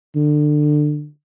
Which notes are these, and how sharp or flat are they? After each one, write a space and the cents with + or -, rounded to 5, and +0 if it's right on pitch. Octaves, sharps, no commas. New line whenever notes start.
D3 +25